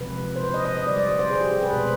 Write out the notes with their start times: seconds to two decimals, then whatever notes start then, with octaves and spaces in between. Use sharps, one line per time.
0.01 C3 F3 G#3 B4
0.36 C5
0.44 B4
0.54 D#5
0.65 D#5
0.77 D#5
0.87 D3 G3 D5
0.98 D5
1.09 D5
1.19 C5
1.30 G#4
1.41 G4
1.51 G#4
1.63 B4
1.73 B2 G#3 C5